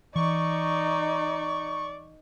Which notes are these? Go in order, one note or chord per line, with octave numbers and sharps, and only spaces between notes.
E3 D#4 D5 C#6